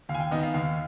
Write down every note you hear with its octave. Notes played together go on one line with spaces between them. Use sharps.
D#2 F5
G#5
G5
D#3 B3 D#5
F5
D#2 F5